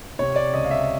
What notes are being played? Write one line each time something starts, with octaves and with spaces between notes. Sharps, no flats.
C3 C#5
D5
C#2 D#5
F5
E5